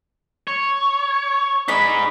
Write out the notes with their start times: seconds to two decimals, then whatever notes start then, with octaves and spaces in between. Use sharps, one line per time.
0.47 C#5
1.68 D#4 G#4 D5 B5